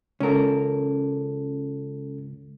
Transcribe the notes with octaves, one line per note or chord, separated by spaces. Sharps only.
C#2 C#4 A4 A#4